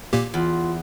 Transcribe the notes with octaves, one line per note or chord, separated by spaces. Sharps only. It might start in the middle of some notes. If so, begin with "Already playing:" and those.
A#2 A#3 G4
E2 F4